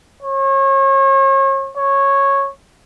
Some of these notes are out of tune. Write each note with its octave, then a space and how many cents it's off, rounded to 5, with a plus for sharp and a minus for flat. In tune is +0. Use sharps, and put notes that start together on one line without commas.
C#5 -35
C#5 -10